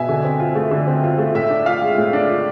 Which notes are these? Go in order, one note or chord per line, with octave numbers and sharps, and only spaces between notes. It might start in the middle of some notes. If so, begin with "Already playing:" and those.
Already playing: B2 E5 G#5
D3
C4
F4
A3
D3
C4
F4
A3
A2 E5
D4
F4 F5
G#3
A2
D4
F4